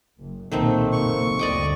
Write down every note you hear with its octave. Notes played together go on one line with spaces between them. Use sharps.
F#1
B1 A#2 D#3 A3 A#3 C4
F#1 C3 C#6
D2 G2 D5 D#5 D6